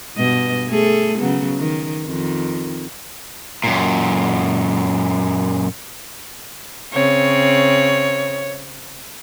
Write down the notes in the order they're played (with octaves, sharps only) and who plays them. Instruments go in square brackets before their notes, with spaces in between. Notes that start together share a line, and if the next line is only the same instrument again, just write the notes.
[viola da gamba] G2 B2 D#5
A3 G#4 A4
C#3 F#3 B3
D#3
F2 D#3
[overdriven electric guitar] F#2 A#2
[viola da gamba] C#3 C4 [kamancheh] C#5